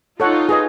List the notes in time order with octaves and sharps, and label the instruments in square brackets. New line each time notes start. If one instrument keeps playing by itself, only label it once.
[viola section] D#4 F4 [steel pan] A4 C#5 F#5
[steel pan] G#4 B4 D#5